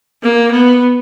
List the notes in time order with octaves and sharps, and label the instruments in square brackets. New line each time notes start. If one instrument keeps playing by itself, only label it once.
[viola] A#3
B3